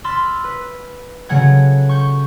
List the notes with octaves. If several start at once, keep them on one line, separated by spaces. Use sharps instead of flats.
B5 C6 E6 F6 A6
B4
C#3 F#3 A3 F#5 G#6
C#6 G6